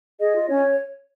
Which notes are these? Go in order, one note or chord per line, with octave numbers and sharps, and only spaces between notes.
G#4 D#5
F4
C#4 C#5